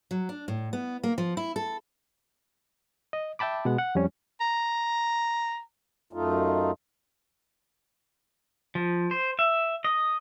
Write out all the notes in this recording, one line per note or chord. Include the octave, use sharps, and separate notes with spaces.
F#3
D4
A2
B3
A#3
F3
E4
A4
D#5
E5 G5 A5 B5 D6
B2 G#3 B3 F#5
F#5
F2 G3 C#4
A#5
F#2 A3 D#4 F4
F3
C5
E5
D#5